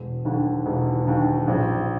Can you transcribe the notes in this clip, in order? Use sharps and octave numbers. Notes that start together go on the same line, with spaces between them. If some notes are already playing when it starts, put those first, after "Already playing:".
Already playing: E1
D#2 D3
E1
D#2 D3
A#1